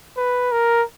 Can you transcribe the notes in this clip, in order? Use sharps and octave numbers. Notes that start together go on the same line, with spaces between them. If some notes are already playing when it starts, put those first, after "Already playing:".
B4
A#4